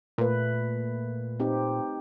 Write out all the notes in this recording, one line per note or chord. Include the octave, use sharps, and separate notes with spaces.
A#2 A3 B4
C4 D#4 G4